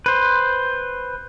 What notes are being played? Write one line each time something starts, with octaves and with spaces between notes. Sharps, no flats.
B4 C5